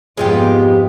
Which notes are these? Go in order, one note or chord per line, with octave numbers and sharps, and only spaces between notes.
F2 G#2 G#3 B3 F4 G4